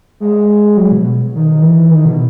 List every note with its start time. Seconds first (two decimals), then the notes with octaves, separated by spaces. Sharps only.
0.20 G#3
0.77 F#3
0.92 B2
1.35 D#3
1.54 D#3
1.62 E3
1.91 D#3
2.05 B2